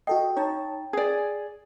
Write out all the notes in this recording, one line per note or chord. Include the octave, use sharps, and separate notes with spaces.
F#4 A4 D#5 G5
D#4 C#5 A5
G#4 D5 G#5